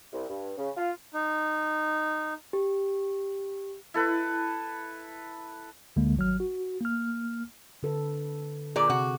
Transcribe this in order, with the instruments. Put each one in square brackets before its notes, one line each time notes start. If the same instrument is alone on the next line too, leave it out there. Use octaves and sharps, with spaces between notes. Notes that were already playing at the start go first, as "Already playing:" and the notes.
[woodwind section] C2
G2
C#3
F4
[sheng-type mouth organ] D#4
[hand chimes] G4
[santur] E4 A4 B4
[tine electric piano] D2 D3 G#3 A#3
G#1 F#3 F6
F#4
A#3 F6
[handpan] D3 A4 B4
[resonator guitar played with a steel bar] A#2 D5 [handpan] G#4
[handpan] C3 [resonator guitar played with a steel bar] F#4